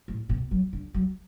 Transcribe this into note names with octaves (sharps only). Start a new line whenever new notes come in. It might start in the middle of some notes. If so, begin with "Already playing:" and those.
A2
B2
F#3
D3
F#3